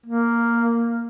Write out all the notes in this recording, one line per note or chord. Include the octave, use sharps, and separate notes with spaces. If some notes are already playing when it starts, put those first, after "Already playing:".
A#3